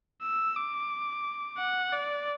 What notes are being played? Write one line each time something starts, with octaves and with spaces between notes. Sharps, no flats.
E6
D6
F#5
D5